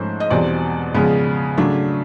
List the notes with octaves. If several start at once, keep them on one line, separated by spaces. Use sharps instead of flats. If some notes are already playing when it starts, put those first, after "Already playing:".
Already playing: G#2 F3 A3 C#4 C5
D#5
E2 B2 G3 C4 D5
C#3 F3 G#3 B3
C#3 F#3 A3 D4